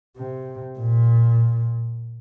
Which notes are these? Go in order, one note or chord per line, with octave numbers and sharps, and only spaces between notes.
C3
A#2